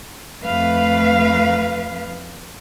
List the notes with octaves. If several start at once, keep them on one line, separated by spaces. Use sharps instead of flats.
F2 A3 B4 F5